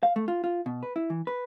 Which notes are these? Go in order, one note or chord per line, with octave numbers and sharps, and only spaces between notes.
F5
A3
F4
F4
B2
B4
E4
E3
B4